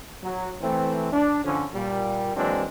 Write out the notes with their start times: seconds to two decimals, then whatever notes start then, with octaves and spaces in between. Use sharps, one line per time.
0.23 F#3
0.61 E3 A3 C4
1.12 D4
1.44 D3 F3 C#4
1.73 A#2 G3
2.35 E3 F#3 G#3 A#3 C4 D4